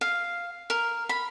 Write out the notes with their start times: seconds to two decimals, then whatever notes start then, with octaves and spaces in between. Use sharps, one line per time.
0.01 F5
0.70 A#4
1.09 B5